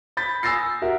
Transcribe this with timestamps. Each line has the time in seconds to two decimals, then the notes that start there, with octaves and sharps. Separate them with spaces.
0.17 B5 G6 A6 B6
0.43 G#5 D#6 E6 A6 A#6 C7
0.82 F#4 A#4 E5